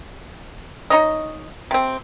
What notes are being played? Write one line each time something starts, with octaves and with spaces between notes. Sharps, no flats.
D#4 C#5 D#5
C3 C4